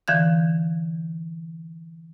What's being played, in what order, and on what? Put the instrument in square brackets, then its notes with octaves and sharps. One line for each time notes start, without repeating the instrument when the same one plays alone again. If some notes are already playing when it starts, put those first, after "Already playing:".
[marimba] D3 E3 F5 G6